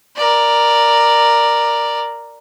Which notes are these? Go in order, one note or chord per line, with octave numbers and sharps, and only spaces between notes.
A#4 D5